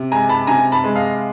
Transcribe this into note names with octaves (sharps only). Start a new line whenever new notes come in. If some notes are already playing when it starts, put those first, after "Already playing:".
Already playing: C3
G#3 G#5 A#5
A5 B5
C3 G#5 A#5
A5 B5
G#3
D#5 F5